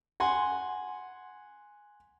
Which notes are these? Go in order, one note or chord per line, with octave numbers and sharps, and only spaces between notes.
F#5 G#5 C6